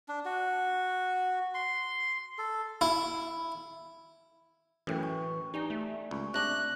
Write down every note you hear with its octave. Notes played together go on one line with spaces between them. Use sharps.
D4
F#4
C6
A4
E4
F#2 A2 E3 C#4 G5
C#6
D#4 G4 D5 G#5
A3
C#2 C#6
C3 D4 D6 F#6 A#6